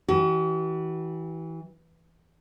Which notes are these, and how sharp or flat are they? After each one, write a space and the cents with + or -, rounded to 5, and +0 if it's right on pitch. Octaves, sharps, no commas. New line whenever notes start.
E3 -20 F#4 +45